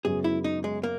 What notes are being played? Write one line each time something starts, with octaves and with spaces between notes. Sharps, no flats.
F#2 C#3 G#3 B3 G#4
E4
D#4
G#3
A#3